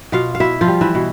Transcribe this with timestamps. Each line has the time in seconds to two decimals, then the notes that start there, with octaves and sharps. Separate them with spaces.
0.12 B2 F4 F5
0.35 F5
0.40 B2 E4 E5
0.61 F3 F4
0.68 G3
0.81 E3 E4
0.95 B2